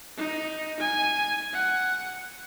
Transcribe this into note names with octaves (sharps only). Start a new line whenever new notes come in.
D#4
G#5
F#5